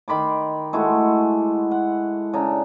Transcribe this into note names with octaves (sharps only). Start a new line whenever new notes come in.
D#3 B5 C6 D6
G#3 A3 E4 F#4
F#5
C#3 D4 A#5